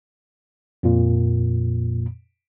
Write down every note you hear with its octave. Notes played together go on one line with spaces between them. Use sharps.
F2 A#2